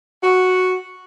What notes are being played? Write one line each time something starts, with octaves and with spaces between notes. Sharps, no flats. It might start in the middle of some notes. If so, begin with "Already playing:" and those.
F#4